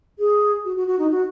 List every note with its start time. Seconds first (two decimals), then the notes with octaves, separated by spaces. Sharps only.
0.19 G#4
0.65 F#4
0.76 F#4
0.87 F#4
0.99 D#4
1.11 F#4